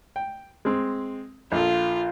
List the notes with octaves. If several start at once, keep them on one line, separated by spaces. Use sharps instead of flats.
G5
G#3 C4
A#1 F4 A4